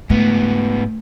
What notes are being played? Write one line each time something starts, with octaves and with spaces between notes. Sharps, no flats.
G#2 A3 B3